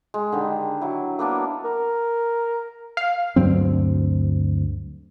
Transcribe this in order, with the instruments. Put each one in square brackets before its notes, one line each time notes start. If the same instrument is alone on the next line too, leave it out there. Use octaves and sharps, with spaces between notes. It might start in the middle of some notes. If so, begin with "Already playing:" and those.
[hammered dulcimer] G#3
D3 D#3 G3
F#3 E4
A#3 B3 D4 A#4
[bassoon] A#4
[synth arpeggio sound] F5
[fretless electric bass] D2 G2 F#3 C4